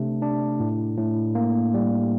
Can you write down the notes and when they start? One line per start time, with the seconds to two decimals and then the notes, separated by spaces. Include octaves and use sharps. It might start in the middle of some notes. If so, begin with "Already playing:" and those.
Already playing: C3 A3 D4
0.22 D4
0.60 A2
0.98 A2
1.35 A#3
1.74 G3